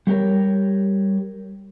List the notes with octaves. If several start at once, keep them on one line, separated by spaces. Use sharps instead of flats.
G3 A3 G4 A#4 C#5